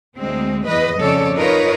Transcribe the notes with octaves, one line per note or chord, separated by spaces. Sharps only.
D2 G#3 C4
E2 B4 D#5
F2 C#3 A4 C#5 D5
D#4 F4 A#4 B4 C#5 D#5